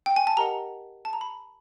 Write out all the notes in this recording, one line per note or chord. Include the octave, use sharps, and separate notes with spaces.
G5
G#5
A5
G4 A#4 D#5 F#5 A#5
A5
A#5
B5